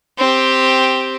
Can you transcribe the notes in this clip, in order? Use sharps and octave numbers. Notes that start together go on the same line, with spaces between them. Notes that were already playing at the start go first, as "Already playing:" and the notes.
C4 G4